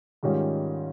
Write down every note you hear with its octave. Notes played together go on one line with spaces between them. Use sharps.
G#2 D#3 G3 C#4 F4